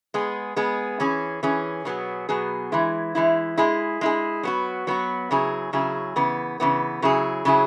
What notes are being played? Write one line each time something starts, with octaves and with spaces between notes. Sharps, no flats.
G#3 B3 G#4
G#3 B3 G#4
E3 C#4 G#4
E3 C#4 G#4
B2 F#3 B3 G#4
B2 F#3 B3 G#4
E3 G#3 E4
E3 G#3 E4
G#3 E4 G#4
G#3 E4 G#4
F#3 B3 F#4
F#3 B3 F#4
C#3 F#3 E4 G#4
C#3 F#3 E4 G#4
C#3 E3 B3
C#3 E3 B3
C#3 F#3 E4 G#4
C#3 F#3 E4 G#4